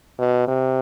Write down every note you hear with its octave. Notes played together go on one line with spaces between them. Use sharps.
B2
C3